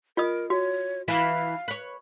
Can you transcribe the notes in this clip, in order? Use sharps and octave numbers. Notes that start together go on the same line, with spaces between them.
F4 A#4 D#5 D#6
F#4 C#5
E3 E4 B4 F5
B4 C#5